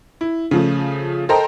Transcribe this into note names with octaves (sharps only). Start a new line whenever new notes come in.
E4
C#3 F3 A3
A4 A#4 C5 D#5 G5 A#5